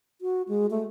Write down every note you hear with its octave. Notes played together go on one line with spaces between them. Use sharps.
F#4
G#3
A3